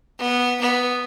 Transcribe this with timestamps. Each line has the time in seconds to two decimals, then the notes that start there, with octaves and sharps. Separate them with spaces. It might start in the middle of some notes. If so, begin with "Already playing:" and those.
0.19 B3
0.61 B3